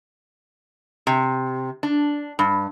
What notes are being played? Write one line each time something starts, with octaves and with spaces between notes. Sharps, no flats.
C3
D4
G2